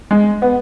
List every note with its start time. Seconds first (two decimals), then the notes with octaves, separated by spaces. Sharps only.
0.11 G#3
0.42 B3